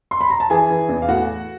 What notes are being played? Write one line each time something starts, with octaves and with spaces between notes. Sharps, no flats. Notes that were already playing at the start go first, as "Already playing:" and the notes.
C6
B5
A#5
A5
E3 G#4 G#5
E3
E2
F5
A2 F#4 F#5